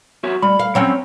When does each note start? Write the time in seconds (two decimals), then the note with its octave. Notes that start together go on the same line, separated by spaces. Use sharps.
0.24 F#4 C#5 E5
0.42 G3 B5
0.59 F5
0.75 F#3 C4 C#4